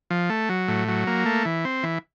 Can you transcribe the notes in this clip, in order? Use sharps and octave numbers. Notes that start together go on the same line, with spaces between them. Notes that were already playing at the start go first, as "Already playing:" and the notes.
F3
A3
F#3
A2
F#3
A#3
A3
E3
C4
E3